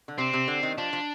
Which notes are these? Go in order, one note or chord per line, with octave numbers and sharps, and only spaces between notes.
D3
C3 C4
C3
D3
D#3
F3 D4
F3